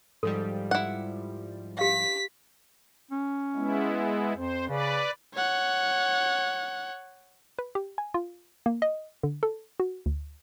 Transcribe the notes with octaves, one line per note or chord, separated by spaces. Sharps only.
G#2 F3 G3 A4
E4 F#5
G4 F5 B6
C#4
G#3 B3 E4
F2 C5
C#3 B4 D5
C#5 F#5
B4
G4
G#5
F4
A#3
D#5
D3
A4
F#4
D2